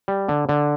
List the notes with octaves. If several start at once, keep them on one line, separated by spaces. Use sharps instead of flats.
G3
D3
D3